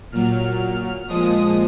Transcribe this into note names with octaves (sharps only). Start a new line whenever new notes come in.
A#2 F#3 F6
A#2 F3 G#3 D#6